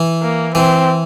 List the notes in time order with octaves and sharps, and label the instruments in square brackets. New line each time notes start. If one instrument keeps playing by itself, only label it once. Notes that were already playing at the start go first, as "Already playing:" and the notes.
Already playing: [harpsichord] E3
[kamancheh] A#3
[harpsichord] E3 [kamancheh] C4